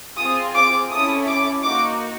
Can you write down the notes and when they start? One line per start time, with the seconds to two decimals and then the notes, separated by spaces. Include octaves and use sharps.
0.18 C4 F4 G#4 D#6
0.55 D6
0.90 C#4 E4 A4 D#6
1.27 D6
1.64 A#3 D#4 F#4 D6